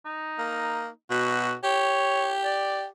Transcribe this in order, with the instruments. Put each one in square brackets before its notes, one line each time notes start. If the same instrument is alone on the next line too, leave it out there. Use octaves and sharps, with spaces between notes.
[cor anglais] D#4
[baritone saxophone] A#3
[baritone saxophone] B2 [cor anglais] F#4
[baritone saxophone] G4 [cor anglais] C#5
[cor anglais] D5